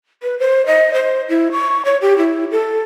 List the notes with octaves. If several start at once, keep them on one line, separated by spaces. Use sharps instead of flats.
B4
C5
D#5
C5
E4
C#6
C#5
G4
E4
A4